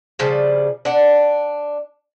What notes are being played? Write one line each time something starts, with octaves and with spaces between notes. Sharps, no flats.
C#3 F3 G3 D4
D4 F#5